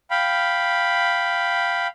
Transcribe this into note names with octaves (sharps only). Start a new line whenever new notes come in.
F5 G5 B5